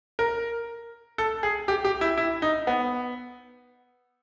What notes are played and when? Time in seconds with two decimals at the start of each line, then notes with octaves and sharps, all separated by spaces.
0.19 A#4
1.18 A4
1.43 G#4
1.68 G4
1.85 G4
2.01 E4
2.17 E4
2.42 D#4
2.67 B3